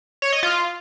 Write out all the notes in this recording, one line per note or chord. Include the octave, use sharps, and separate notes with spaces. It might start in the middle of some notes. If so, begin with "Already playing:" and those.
C#5
D#5
F4